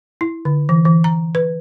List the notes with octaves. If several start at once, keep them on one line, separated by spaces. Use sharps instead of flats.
E4
D3
E3
E3
A#5
B4